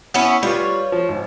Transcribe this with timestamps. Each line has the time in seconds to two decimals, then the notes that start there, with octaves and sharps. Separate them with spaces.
0.14 B3 C#4 E4
0.43 G3 F4 B4 C#5
0.92 F3
1.09 G#1